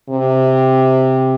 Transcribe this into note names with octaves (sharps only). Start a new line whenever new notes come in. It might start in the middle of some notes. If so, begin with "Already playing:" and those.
C3